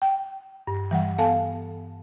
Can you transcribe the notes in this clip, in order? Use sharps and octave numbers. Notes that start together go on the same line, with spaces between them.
G5
G2
E3 G3 F#5
B3 A4 F5 G#5 A5